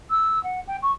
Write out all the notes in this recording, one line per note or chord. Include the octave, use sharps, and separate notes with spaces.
E6
F#5
G5
C#6